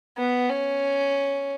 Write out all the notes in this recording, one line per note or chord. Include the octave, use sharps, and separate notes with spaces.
B3
C#4